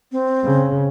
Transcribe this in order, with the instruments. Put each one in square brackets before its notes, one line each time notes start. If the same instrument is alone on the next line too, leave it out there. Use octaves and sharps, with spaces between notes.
[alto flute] C4
[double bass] C#3